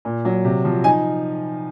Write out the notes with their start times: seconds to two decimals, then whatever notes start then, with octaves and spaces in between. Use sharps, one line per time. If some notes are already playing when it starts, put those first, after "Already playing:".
0.05 A#2
0.25 F#3
0.45 C3
0.65 F3
0.84 D#4 G#5